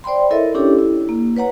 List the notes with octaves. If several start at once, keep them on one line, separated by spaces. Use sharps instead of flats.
C5 D5 G5 B5 C6
E4 A4 A#4 C#5 D#5 E5
C#4 D4 E4 G4 A4 C#5
E4
A#3
B4 C#5 F#5 A#5